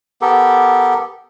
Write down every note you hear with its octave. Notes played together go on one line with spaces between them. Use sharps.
B3 G4 A4 A#4